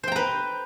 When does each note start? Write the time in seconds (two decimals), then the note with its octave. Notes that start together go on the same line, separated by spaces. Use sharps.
0.03 C5
0.08 G5
0.12 A#5
0.16 B4